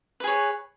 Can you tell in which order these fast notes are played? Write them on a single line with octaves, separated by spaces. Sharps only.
B4 G#4 C#5